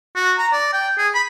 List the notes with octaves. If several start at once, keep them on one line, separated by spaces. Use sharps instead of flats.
F#4
A#5
D5
G5
G#4
B5